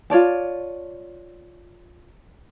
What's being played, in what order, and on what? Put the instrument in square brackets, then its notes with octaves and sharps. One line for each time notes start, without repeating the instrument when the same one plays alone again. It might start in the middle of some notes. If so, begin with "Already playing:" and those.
[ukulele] F4 C#5 D5 A5